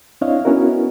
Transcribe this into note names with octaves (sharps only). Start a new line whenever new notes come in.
C4 D4 E4 C#5 D#5 F5
B3 C#4 E4 F#4 A#4